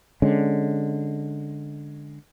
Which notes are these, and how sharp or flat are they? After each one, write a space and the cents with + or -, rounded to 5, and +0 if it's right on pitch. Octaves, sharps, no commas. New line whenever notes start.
D3 +0 G#3 +0 C#4 +0